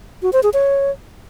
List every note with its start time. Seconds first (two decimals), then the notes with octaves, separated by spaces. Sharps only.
0.22 F#4
0.33 C5
0.43 G#4
0.54 C#5